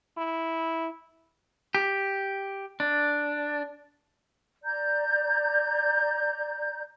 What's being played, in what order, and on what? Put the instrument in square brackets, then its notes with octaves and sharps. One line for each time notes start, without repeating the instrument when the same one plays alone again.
[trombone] E4
[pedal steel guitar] G4
D4
[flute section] D5 A#5 G6